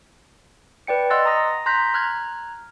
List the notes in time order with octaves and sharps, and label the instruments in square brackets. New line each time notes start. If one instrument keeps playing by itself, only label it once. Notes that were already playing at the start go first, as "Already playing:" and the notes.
[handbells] B4 D5 G5 C#7
D#5 F#5 C6 E6 F#6 A6
A#5 D#6 A#6
A#5 C6 F#6 G6 A#6 B6
A#5 F6 F#6 G#6